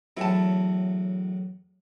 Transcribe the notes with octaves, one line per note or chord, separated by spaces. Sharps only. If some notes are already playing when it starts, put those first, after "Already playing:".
E2 A2 F#3 E4 A5